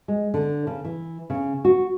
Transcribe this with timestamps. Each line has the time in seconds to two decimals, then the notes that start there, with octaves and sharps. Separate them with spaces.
0.08 G#3
0.34 D3
0.67 C#3
0.85 E3
1.30 C#3
1.65 F#4